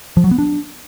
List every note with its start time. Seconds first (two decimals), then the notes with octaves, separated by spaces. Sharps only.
0.17 F3
0.24 F#3
0.31 B3
0.38 D4